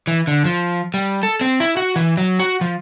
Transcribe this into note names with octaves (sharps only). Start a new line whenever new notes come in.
E3
D3
F3
G3
A4
C4
E4
F#4
E3
F#3
F#4
F3